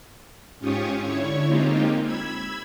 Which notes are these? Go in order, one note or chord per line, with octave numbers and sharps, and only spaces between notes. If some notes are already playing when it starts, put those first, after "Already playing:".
G#2 C#4 F4 G4 C#6 D#6
D3 E4 C#5 C#6
G#3 A#3 C4 D#4 F4 G4
B5 E6 G#6